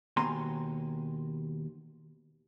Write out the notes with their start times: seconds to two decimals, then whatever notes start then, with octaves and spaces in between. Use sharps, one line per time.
0.17 D#2 B2 G#5 A#5 C6